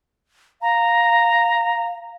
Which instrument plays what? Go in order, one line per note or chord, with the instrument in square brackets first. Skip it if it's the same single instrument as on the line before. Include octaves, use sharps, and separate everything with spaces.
[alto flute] F5 [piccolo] A#5